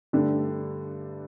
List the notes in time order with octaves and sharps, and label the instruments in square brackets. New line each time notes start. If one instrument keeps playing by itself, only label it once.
[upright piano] G2 D3 A3 D4 G4